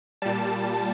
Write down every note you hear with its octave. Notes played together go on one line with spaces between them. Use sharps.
A#2 G3 A5